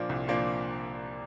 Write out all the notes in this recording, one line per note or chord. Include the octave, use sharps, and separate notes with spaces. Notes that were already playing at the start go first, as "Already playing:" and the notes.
Already playing: A#2 F3 A#3 D4
C2
A#2 F3 A#3 D4